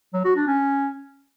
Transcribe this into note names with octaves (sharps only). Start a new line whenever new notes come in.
F#3
F#4
D4
C#4